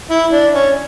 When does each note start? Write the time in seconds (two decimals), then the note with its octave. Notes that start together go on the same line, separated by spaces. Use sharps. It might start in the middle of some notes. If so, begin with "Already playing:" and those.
0.10 E4
0.32 D4
0.54 C#4